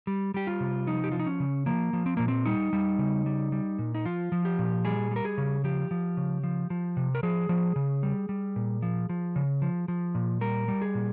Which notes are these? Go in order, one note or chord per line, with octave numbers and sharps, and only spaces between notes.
G3
G3 G4
F4
C3
F3 D#4
G4
F3 F4
D#4
C#4
C#3
F3 A#3
F3
C4
A#2 A#3
C4
G3 D#4
G3
C#3
G3
G3
A#2
D#4
F3 F4
F3
G4
A#2
G3 G#4
G3 A#4
G#4
C#3
F3 G4
F3
C#3
F3
F3
C3
A#4
F3 G#4
F3
C#3
G3
G3
A#2
F3
F3
C#3
F3
F3
A#2
G3 A#4
G3
G#4
A#2